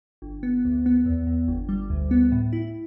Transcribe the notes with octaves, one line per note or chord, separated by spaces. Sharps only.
G1
B3
D2
B3
E2
E2
G1
G3
D2
B3
A2
E4